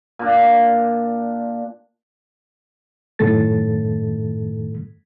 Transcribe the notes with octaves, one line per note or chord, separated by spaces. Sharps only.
A#2 D4
F#2 A2 D#3 A3 A4 A6